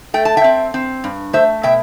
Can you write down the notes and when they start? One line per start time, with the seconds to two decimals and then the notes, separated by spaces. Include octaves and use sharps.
0.14 A3 G5
0.25 A5
0.37 E5 G5
0.44 C4
0.74 C4
1.04 G2
1.33 A3 C5 E5
1.63 B2 E5 G5